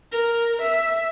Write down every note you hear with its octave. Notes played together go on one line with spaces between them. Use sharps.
A#4
E5